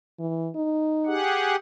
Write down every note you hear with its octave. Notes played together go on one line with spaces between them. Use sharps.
E3
D#4
G4 G#4 F#5